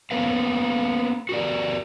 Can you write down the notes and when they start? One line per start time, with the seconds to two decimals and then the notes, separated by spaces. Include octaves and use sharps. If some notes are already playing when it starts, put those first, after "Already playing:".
0.11 A#3 B3 C#4 B4 F5
1.29 F#4 G4 A#4 D5